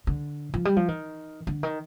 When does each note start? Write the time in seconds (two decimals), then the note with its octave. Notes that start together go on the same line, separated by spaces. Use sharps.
0.07 D3
0.54 F3
0.65 G3
0.76 F3
0.88 D#3
1.47 D3
1.63 D#3